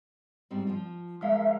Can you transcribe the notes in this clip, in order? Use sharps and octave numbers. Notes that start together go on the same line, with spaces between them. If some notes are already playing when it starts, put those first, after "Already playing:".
G#2 G3 C4
F3 F4
F3 G#3 A#3 E5 F5